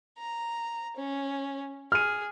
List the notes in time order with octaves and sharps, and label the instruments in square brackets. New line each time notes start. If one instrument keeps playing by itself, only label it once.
[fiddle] A#5
C#4
[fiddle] G#4 [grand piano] F6 D#7